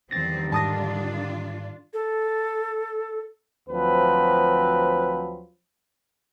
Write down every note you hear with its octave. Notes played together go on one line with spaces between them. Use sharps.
E2 D3 D#3 F3 G3 C4 A6 A#6
G#2 D4 F4 A5 D#6 A#6
A4
D2 F3 F#3 C4 B4